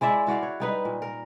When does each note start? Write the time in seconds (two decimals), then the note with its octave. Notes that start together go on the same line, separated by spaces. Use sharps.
0.01 G#3 E4 D5 E5
0.27 E4 F#4 D5 F5
0.43 C#5
0.60 G3 D#4 B4
0.85 A#2
1.02 A#4